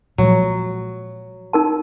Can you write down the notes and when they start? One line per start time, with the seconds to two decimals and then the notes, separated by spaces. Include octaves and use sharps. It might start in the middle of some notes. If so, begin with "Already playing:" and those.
0.18 A#2 F3 F#3 G#3
1.53 D#4 A#4 A5